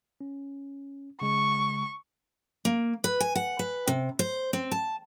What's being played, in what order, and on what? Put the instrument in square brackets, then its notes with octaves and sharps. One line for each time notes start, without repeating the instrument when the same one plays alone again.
[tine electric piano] C#4
[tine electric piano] C#3 G#3 [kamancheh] C#6
[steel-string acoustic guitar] A#3
B4
G#5
F#5
B4
C3
C5
C4
A5